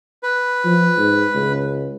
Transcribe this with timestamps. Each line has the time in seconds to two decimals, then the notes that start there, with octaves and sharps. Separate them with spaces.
0.23 B4
0.65 F3
0.97 G#2
1.34 C#2